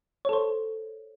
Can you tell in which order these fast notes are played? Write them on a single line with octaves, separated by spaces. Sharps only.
C#5 A4 C5